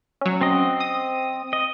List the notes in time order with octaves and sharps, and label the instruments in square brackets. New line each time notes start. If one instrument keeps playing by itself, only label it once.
[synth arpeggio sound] F#3 C#4
[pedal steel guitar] C4 D#5
[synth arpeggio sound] D#6
[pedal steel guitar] D#5